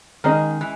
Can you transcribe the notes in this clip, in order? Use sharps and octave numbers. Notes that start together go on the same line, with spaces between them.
D#3 G#3 C#4 G#4 D#5
E3